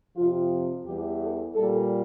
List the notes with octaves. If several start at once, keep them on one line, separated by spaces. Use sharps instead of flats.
F2 C3 F3 F4
E2 E3 G3 G4
A4
A#2 G3 A4